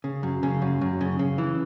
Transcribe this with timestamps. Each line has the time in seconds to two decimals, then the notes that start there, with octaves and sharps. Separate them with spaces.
0.04 C#3
0.23 F#2
0.43 C#3
0.62 F#2
0.81 F#2
1.01 C#3
1.19 C#3
1.38 E3